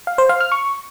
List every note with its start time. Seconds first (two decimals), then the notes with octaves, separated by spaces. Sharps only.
0.07 F5
0.18 C5
0.29 F5
0.40 F6
0.52 C#6